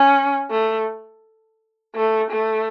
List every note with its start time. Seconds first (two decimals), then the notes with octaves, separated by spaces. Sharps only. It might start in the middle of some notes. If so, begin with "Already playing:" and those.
Already playing: C#4
0.51 A3
1.96 A3
2.31 A3